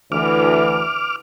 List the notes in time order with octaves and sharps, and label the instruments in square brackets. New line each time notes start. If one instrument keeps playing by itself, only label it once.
[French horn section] D2 E3 [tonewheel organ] D6 F6